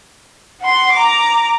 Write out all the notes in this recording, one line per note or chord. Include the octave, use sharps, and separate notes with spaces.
F#5 C6
A#5 D6